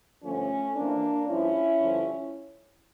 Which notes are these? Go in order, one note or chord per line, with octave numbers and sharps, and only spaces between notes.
G2 D3 F3 A3 C#4
F2 E3 A#3 D4
G2 F3 C#4 E4
G2 D3 F3